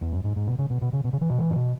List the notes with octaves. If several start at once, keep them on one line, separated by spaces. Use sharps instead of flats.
E2
F#2
G#2
G#2
B2
C#3
B2
B2
C#3
B2
C#3
E3
B2
E3
G#2
B2